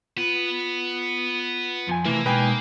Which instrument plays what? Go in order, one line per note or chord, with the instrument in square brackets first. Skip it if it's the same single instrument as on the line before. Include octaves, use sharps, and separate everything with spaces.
[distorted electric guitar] B3 B4 [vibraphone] F4
[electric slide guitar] F2 F3 G#5
[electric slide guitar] C3 A3 [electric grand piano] E3 [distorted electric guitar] A#3
[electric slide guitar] B2 G#3 D#4 [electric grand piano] B4 G5 G#5